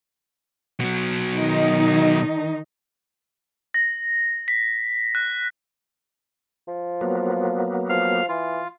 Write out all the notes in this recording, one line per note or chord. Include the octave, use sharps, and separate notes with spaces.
B2 F#3
D#3 D#4
A#6
B6
F#6
F3
F#3 A#3 B3
F3 F5 F6
E3 F4